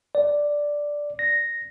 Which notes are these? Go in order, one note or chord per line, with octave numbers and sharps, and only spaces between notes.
D5
A#6